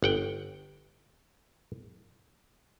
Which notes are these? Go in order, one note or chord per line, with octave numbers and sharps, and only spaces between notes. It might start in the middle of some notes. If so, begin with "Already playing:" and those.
G1 F#5 G5